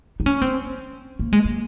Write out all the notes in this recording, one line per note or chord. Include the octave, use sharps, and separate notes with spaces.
D#4
C#4
C4
A#3
G#3
A#3